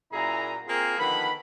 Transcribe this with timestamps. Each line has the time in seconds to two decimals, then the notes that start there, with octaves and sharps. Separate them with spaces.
0.13 F#2 A#2 E4 G#4 A#5
0.67 A#3 C4 F4 G#4
0.99 D3 D#3 F3 B3 B5